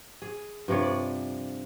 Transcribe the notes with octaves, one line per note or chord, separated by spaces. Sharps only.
G#4
G2 C3 F3 C#5
D5